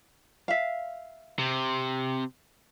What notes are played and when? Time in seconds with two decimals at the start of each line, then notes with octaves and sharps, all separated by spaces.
0.48 E5 F5
1.39 C3